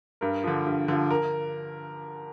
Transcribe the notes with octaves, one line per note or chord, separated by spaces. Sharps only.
G2 A#4
D3 F3
G2
D3 F3
A#4